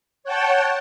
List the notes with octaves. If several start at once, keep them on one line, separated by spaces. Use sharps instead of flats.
C#5 F#5 G5 A5